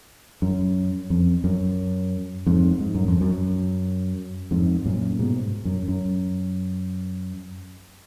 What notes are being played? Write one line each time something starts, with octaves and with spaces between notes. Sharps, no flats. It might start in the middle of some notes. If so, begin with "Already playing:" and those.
F#2
F2
F#2
F2 G#2
G#2
F#2
F2
F#2
F2 G#2
F#2 A#2
G#2 B2
F#2
F#2